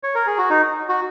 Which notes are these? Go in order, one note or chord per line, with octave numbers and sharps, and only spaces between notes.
C#5
A#4
G#4
F#4
D#4
F#4